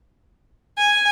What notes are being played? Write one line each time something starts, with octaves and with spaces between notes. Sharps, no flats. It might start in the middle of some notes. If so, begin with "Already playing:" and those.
G#5